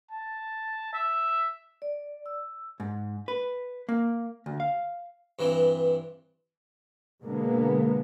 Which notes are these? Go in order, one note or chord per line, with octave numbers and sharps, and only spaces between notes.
A5
E5
D5
E6
G#2
B4
A#3
D2
F5
G2 E3 C4
B2 D3 G#3 A#3 B3